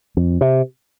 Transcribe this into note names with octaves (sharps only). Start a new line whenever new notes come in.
F2
C3